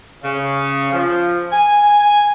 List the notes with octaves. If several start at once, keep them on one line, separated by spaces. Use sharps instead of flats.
C#3
F3
G#5